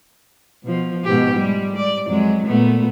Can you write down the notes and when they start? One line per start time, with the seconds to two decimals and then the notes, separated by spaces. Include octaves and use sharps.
0.63 B2 F3
1.04 G#2 B2 G4
1.36 G3 G#3
1.76 D5
2.08 F2 F#3 G#3
2.46 A#2 A3 B3